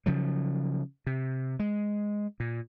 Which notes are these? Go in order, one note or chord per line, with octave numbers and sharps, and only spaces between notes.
C#3 F3 F#3
C3
G#3
A#2